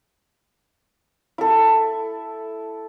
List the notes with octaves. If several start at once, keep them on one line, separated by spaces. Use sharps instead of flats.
E4 A4